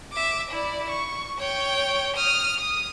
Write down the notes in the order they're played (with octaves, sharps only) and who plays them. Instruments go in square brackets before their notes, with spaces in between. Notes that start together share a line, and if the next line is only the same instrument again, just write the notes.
[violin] E5 D6
E4 D5
C#6
C#5 G5
D#6 F6
D#6